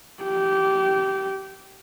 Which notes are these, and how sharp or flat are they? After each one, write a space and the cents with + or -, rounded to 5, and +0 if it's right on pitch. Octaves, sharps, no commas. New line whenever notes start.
G4 -20